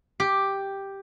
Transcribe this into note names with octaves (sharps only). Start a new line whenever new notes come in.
G4